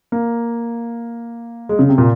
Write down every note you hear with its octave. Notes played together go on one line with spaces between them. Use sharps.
A#3
G#3
C#3
C3
A#2